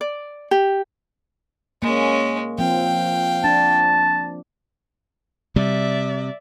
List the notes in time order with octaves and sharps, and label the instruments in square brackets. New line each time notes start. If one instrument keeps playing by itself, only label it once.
[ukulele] D5
G4
[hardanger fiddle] G#3 C#4 [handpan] A#3
[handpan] F3 C4 [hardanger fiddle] F5 G5
[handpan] D4 [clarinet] A5
[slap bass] C3 G3 [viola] D5 E5